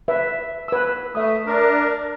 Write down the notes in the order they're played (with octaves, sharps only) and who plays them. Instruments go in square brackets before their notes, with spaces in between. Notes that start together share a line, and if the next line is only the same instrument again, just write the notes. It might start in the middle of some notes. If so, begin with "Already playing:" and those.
[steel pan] B4 E5
B4 E6
[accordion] A3 [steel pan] E5 D#6
[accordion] D4 A#4